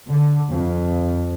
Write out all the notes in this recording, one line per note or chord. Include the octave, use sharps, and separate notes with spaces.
D3
F2